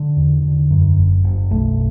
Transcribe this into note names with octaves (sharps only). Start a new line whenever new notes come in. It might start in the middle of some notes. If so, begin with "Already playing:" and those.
Already playing: D3
E2
D3
F#2
F#1
F#1
B1 A3